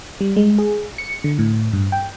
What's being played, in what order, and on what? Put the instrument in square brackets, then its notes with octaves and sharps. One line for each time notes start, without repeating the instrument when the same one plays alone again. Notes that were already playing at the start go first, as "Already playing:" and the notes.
[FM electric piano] G3
G#3
G#4
C#7
D3
A2
G2
G5